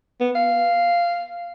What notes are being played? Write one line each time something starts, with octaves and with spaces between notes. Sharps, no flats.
B3
F5